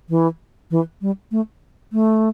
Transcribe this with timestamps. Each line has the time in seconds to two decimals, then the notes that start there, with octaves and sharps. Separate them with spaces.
0.09 E3
0.71 E3
1.02 G3
1.31 A3
1.93 A3